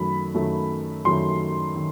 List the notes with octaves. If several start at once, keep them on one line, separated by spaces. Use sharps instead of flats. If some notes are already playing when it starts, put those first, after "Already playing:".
Already playing: F#2 D#3 F#3 A3 B5
F#2 D#3 F#3 A3
F#2 D#3 F#3 A3 C6
D#3